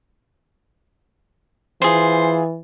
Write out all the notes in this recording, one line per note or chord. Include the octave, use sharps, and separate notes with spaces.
E3 F4 G#4 C5